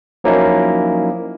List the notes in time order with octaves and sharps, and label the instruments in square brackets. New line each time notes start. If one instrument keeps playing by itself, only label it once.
[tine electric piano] F3 F#3 A#3 C#4 D#4 E4